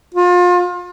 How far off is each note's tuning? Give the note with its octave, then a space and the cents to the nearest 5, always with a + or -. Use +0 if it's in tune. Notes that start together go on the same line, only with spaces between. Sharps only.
F4 +30